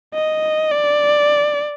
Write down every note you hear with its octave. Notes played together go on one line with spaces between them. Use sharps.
D#5
D5